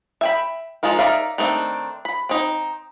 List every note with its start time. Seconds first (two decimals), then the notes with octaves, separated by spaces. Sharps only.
0.21 E5 G5 B5
0.83 F3 G#3 D#4 F4 A#4
0.99 D#4 A#4 D5 E5 F5
1.38 D#3 A3 C4 D4
2.05 B5
2.29 C4 D#4